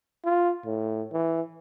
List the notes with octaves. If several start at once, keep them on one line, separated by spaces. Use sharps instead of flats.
F4
A2
E3